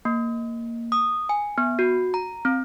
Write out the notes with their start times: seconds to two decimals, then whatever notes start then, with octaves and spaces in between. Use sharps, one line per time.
0.05 A#3
0.92 D#6
1.29 G#5
1.58 B3
1.79 F#4
2.14 A#5
2.45 C4